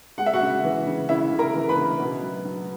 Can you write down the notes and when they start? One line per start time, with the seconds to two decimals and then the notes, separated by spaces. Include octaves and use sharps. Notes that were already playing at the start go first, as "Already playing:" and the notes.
0.18 G#3 F#5
0.26 E5
0.33 F#4 F#5
0.41 C#3
0.64 E3
0.86 C#3
1.09 C#3 E4 E5
1.32 C#3
1.39 A#4 A#5
1.55 E3
1.69 B4 B5
1.77 C#3
2.00 B2
2.22 F#3
2.45 F#3